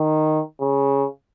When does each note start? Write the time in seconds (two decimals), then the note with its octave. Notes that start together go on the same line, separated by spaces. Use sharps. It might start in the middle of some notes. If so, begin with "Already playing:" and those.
Already playing: D#3
0.60 C#3